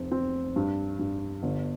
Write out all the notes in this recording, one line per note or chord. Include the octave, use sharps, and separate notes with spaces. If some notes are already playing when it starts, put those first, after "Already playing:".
Already playing: F1 C4
C4
G2
G2
G1